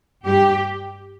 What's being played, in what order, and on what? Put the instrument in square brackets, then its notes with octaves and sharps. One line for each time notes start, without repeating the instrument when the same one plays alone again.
[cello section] G2 G3 G4